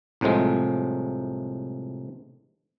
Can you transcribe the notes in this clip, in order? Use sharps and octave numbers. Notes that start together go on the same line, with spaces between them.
C2 A2 C3 F3 G#3